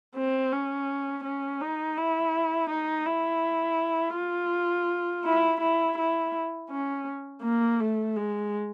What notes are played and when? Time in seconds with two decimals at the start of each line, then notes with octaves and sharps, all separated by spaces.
0.15 C4
0.52 C#4
1.24 C#4
1.61 D#4
1.98 E4
2.70 D#4
3.06 E4
4.16 F4
5.24 E4
5.61 E4
5.98 E4
6.70 C#4
7.43 A#3
7.80 A3
8.16 G#3